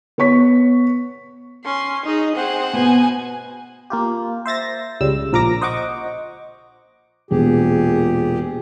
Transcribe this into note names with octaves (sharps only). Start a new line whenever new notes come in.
B3 C#5 C#6 B6
C#4 C6
D#4 G#4 D#5
C4 G#4 C5 F#5
B2 B3 G#5
A#3 F4 G4
C5 E5 A6 A#6
C#2 C#3 G3 E6
A#1 F3 A#4 A#5 D6 A#6
C5 D#5 F#5 C#6 D6
E1 A#2 G4 G#4